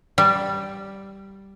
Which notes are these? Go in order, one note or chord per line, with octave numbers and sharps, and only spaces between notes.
G3